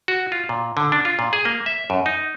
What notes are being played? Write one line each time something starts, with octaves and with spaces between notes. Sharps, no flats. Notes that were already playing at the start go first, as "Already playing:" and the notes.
F#4
F4
A#2
D3
D4
F4
A#2
G#4
A#3
E5
F#2
D#4